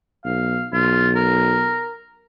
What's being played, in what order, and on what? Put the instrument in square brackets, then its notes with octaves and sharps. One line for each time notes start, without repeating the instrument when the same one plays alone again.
[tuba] B1 [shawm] F5
[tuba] B1 [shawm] F4
[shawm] A#4